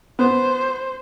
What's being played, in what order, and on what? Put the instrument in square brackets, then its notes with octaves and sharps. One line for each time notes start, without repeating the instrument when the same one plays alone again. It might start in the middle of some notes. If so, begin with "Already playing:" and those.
[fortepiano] B3 [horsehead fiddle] C5